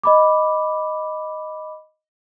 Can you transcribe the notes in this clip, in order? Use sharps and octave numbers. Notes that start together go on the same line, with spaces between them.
D#5 B5 D6